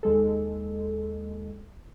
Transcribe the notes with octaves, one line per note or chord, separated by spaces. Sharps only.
D#2 G#3 A4